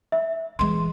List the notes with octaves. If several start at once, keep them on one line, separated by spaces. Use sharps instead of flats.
E5
E3 G#3 C6